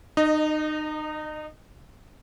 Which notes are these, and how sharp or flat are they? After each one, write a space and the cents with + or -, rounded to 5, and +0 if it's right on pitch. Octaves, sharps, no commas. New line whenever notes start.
D#4 -30 D#5 -5